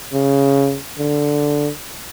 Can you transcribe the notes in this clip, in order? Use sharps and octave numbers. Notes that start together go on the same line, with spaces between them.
C#3
D3